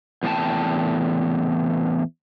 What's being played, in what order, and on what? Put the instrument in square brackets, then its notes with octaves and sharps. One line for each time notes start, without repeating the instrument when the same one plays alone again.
[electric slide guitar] E2 A2 C3 D#4 G5 A5